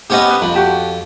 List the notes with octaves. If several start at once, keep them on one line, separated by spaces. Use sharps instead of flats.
B3 C#4 G4 C5 C#5 D#5
B4
F2 B5
F#4 G4 A5